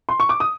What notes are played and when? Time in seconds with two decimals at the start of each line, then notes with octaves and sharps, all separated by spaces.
0.09 C6
0.20 C#6
0.29 D6
0.40 D#6